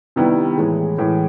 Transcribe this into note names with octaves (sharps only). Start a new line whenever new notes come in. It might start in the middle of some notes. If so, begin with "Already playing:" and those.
C3 D#3 G3 B3 E4
A2 E3 G#3
A2 E3 G#3